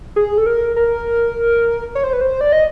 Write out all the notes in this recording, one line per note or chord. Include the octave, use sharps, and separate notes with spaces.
G#4
A4
A#4
A#4
C#5
C5
B4
C5
D5
D#5